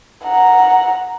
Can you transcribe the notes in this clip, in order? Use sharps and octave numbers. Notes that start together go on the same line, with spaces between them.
F#5 A#5